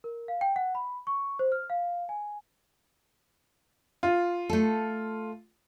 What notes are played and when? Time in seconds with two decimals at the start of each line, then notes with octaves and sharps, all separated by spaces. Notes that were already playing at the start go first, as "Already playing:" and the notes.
0.04 A#4
0.28 F5
0.41 G5
0.56 F#5
0.75 B5
1.07 C#6
1.39 C5
1.52 F6
1.70 F5
2.09 G#5
4.03 F4
4.50 A3 A4